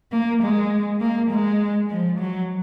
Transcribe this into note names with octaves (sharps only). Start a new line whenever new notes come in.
A#3
G#3
A#3
G#3
F3
F#3